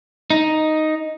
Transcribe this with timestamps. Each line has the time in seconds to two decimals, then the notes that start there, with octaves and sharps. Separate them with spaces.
0.30 D#4